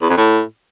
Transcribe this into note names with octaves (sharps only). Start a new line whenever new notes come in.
E2
F2
A2